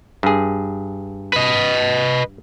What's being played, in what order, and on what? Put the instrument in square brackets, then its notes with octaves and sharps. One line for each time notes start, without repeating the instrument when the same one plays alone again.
[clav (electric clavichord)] G2 G#4
[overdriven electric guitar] B4 D#5